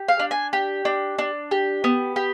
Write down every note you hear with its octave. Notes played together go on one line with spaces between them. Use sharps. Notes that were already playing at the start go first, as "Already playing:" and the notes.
Already playing: G4
F5
D4
G#5
G4
D4
D4
G4
B3
G4